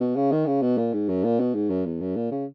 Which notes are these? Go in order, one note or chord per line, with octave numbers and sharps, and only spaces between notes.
B2
C#3
D#3
C#3
B2
A#2
G#2
F#2
A#2
B2
G#2
F#2
E2
F#2
A#2
C#3